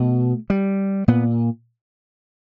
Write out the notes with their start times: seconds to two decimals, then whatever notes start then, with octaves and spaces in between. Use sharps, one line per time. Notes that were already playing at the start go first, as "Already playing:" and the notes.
Already playing: B2 A3
0.50 G3
1.08 A#2 B3